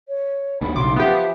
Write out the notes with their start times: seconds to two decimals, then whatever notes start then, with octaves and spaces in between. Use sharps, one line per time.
0.09 C#5
0.61 D#2 B3 D4 B5
0.76 B1 C#3 C6 D6
0.96 F3 B3 G4 E5